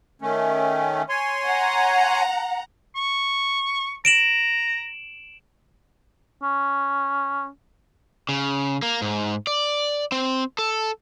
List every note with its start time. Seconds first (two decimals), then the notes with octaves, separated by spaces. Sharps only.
0.22 D#3 A3 C#4
1.09 C#5 G#5 C6
1.45 F#5 A#5
2.95 C#6
4.05 A#5 D7 E7 F#7
6.43 C#4
8.29 C#3
8.83 A#3
9.02 G#2
9.47 D5
10.12 C4
10.59 A4